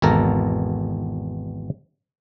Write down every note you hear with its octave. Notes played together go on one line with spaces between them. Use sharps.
G#1 E2 B2 A4 A#4 A#5